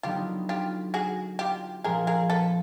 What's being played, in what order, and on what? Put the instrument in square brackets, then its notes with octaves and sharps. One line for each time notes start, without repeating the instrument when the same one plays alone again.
[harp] D3 F#3 B3 D#4 [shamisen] F4 G4
[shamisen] F4 G4
F#4 G#4
F4 G4
[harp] A#2 F3 G#3 C#4 [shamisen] G#4 A#4
[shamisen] G#4 A#4
A4 B4